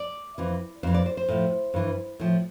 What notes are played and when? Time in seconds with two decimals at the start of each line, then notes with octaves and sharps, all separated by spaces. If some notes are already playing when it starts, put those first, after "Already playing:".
Already playing: D5
0.38 F2 E3
0.83 F2 E3 C5
0.94 D5
1.06 C5
1.17 C5
1.29 A2 F3
1.74 G2 E3
2.19 A2 F3